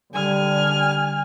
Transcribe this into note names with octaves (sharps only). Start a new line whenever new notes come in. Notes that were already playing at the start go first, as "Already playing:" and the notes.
D3 G3 G#5 F6